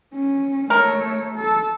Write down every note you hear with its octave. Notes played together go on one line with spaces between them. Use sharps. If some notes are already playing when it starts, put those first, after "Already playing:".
C#4
A3 A#4 C#5
A4